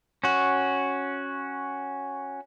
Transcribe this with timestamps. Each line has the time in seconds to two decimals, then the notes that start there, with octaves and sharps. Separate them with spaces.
0.24 C#4 F#4